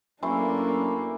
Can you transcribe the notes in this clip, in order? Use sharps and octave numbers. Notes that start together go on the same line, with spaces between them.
F#2 E3 A3 A#3 D4 C6